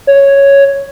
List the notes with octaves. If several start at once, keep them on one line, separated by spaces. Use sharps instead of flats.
C#5